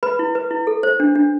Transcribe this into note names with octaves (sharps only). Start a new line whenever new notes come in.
B4 B5
E4
B4
E4
A4
C5
D4
D4